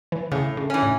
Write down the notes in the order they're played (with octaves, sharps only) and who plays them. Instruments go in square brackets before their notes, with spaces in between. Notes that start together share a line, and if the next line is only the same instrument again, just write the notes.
[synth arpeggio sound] E3
[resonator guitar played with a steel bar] A2 [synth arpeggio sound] C#3
[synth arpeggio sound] C#3
[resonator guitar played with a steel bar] E3 C#4
[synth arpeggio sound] A2